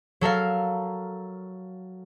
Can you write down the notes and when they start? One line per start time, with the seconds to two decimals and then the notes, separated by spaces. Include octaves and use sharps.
0.21 F#3 A4 A#4 F5